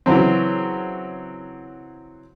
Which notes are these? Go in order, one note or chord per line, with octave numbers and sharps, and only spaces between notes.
C#3 E3 F#3 C4